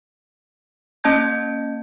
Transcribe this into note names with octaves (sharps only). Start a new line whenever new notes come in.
A#3 C#4 D#5 A5 G6 G#6